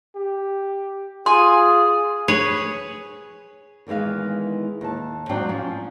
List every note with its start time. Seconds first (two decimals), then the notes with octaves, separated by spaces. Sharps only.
0.16 G4
1.26 F4 G#4 G#5 C6
2.28 G#4 B4 C#5
3.87 E2 D#3 E3 G#3 F5
4.81 D#2 A5
5.29 G#2 F#3 C4 D4 D5 G5
5.49 F3 C#4